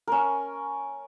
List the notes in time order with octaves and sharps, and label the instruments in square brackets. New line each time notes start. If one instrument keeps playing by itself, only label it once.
[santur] C#4 A#4